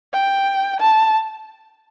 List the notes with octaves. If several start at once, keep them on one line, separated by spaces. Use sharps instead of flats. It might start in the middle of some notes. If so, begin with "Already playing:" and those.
G5
A5